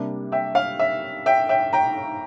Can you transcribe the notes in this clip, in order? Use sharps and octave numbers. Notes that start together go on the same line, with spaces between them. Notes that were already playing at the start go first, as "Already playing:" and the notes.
Already playing: C3 G3 A#3 D4
E5 G5
F5
E5
E5 G5
E5 G5
G5 A#5